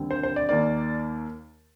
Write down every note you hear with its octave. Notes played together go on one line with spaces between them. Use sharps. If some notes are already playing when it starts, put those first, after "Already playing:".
Already playing: D#2 D3 G3 C4
C5
C5
D5
D#2 D#3 A#3 D5